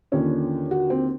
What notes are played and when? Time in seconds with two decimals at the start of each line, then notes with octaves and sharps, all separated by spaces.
0.12 D#2 D3 F3 C#4
0.71 F#4
0.90 C4